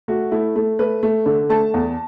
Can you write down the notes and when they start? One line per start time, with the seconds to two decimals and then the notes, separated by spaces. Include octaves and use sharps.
0.08 A3 F#4
0.31 A3 E4
0.56 A3
0.79 A3 B4
1.03 A3
1.26 D3
1.49 A3 A5
1.74 E2